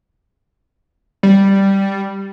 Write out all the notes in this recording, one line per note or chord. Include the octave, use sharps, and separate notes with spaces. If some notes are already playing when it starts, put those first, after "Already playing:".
G3